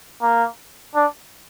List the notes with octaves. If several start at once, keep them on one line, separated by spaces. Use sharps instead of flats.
A#3
D4